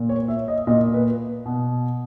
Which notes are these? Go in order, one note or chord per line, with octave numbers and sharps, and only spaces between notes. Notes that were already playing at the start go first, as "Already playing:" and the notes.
Already playing: A#2
C#5
E5
D#5
A#2 D#5
B4
B2